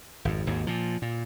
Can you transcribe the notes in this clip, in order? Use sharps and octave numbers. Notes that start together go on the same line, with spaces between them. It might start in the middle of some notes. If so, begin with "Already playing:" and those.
G#1 F2
G#1 D#2 G#2
A#2 F3
A#2